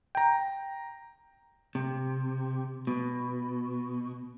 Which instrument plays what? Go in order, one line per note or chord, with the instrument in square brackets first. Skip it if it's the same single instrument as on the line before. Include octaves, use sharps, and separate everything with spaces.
[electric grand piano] G5 A#5
[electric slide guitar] C3
B2